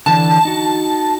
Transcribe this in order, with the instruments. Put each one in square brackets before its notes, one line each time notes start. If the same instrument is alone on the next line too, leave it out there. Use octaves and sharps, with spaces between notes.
[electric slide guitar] D3 E3 D4 [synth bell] A5
[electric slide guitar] D#4 F#4